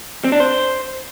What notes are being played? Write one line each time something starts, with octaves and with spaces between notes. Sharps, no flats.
C4
D4
C5